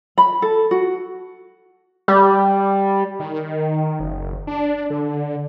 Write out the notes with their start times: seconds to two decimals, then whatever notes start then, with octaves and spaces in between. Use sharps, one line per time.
0.18 B5
0.42 A4
0.71 F#4
2.08 G3
3.20 D#3
4.00 F#1
4.47 D4
4.90 D3